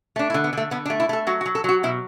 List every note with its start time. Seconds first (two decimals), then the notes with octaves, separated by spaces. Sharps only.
0.16 A3 D4
0.30 E4
0.34 D3
0.44 B3
0.53 D3 A3
0.71 D3 B3
0.86 D4
0.90 A3
1.00 E4
1.09 A3 A4
1.27 F#3 F#4
1.41 F#4
1.46 F#3
1.55 A4
1.64 F#3 F#4
1.83 B2 E4